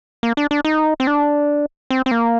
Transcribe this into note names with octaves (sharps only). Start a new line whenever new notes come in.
A#3
D4
D4
D#4
C4
D4
C4
C4
A#3